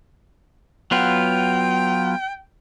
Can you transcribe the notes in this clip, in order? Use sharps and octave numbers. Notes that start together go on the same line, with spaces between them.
F#3 B3 F4 G5